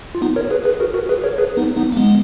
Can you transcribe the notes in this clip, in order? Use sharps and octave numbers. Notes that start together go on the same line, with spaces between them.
F4
B3 D#4
A#4 C#5
G#4 B4
G#4 B4
F#4 A#4
F#4 A#4
G#4 B4
A#4 C#5
G#4 B4
B3 D#4
B3 D#4
A#3
G#3 B3